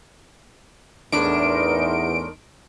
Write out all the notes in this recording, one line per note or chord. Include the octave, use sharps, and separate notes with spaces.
E2 A2 D4 D#4 A#4 C6 D7